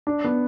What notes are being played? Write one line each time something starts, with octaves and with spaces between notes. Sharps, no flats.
D4
B3